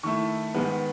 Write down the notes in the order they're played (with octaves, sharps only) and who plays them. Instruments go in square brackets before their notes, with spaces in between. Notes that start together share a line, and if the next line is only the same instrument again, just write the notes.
[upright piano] D#3 A3 E4 C#6
G#2 D#3 G#3 B3